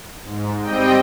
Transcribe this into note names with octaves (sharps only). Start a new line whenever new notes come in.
G#2
G3 C4 D#5 G5